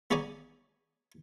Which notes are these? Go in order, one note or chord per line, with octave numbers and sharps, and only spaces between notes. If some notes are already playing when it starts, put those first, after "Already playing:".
B3 G#4 C#5 D5 G#5 A#5